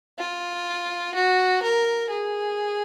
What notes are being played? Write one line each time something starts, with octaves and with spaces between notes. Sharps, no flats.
F4
F#4
A#4
G#4